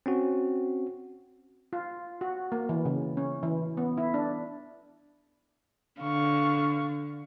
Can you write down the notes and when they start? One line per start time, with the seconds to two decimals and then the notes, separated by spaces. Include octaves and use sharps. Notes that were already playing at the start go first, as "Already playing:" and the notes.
0.06 C4 C#4 F#4
1.73 F4
2.21 F#4
2.52 A#3
2.69 E3
2.85 C#3
3.17 C#4
3.43 E3
3.77 B3
3.98 E4
4.14 D4
6.01 D3 F5 C#6